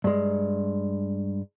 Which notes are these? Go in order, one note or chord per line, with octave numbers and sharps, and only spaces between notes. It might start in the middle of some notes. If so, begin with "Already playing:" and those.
G2 G#3